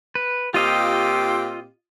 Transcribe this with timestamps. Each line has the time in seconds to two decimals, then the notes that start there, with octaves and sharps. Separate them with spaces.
0.15 B4
0.54 A#2 C4 F4 G4 D#5 F5